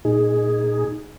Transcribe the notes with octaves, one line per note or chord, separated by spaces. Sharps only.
A#2 D#4 G#4